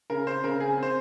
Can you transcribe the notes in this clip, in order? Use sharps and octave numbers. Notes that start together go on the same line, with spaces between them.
C#3 A#4
C4 C5
C#3 A#4
C4 G#4
C4
C5